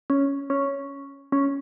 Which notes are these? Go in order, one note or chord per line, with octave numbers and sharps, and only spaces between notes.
C#4
C#4
C#4